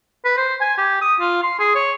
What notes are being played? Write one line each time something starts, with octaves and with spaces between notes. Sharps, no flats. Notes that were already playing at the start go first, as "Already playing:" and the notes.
B4
C5
G#5
G4
D#6
F4
C6
G#4
C#5